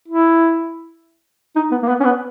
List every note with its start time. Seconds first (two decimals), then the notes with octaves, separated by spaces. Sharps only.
0.08 E4
1.56 D#4
1.72 B3
1.83 A#3
1.88 B3
2.00 C#4
2.05 B3